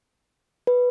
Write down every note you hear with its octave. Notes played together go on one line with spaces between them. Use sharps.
B4